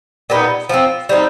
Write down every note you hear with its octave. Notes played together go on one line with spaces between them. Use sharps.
A#2 G3 B3 D#4
F3 A3 C4
G3 C4 D#4